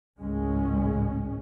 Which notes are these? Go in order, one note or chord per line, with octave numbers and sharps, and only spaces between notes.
G#1 C#2 A2 G#3 C#4